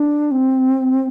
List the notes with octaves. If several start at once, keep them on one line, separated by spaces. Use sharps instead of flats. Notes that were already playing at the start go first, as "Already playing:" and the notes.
Already playing: D4
C4